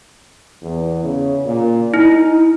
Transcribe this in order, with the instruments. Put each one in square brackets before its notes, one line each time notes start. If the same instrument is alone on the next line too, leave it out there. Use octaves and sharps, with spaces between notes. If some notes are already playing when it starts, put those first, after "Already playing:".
[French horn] E2
C#3
A#2
[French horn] D#4 [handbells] E4